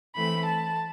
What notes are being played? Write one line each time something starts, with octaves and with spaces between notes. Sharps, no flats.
E3 A3 C4 B5
A5